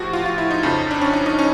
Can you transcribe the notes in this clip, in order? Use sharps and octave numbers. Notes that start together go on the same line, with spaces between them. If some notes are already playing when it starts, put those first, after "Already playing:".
Already playing: A2 F3 A3 F#4 G4
F4
F4
E4
D#4
F2 C#3 F3
D4
C#4
D#4
D#4
C#4